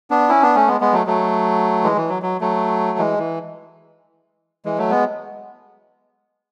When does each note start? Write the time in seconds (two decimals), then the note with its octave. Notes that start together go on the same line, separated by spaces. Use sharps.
0.10 B3 D4
0.29 C#4 E4
0.42 B3 D4
0.55 A3 C#4
0.67 G#3 B3
0.80 G#3 B3
0.93 F#3 A3
1.06 F#3 A3
1.84 E3 G#3
1.97 E3
2.09 F#3
2.22 F#3
2.41 F#3 A3
2.98 E3 G#3
3.19 E3
4.65 E3 G#3
4.78 F#3 A3
4.91 G#3 B3